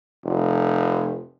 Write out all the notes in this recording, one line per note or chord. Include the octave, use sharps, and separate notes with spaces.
F1